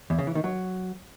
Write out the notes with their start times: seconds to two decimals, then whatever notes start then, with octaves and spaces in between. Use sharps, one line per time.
0.10 E2
0.18 C#3
0.27 E3
0.35 D#3
0.44 F#3